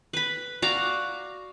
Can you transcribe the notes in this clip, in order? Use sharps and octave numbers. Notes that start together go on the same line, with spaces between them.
B4 B5
F#4 D5 F5 A#5